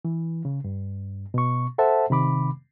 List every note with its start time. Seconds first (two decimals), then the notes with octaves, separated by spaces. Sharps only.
0.05 E3
0.45 C#3
0.64 G2
1.34 B2 C#6
1.78 A4 C5 E5 F#5 A5
2.10 C3 D#3 B5 D6